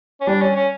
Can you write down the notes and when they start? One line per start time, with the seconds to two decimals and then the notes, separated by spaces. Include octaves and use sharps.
0.21 C#4
0.27 G3 D4
0.42 C#4
0.55 C#4